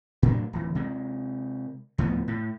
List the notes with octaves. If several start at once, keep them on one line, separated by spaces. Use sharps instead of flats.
A2 F#3 D4
D1 E3
C3 G#3
D2 A2 F3 B3
A2